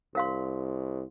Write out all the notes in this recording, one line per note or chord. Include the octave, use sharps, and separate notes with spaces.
C2 A#4 F5 C6